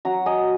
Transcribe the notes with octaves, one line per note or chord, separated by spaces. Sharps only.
F#3 F#5 A#5
D#5 G#5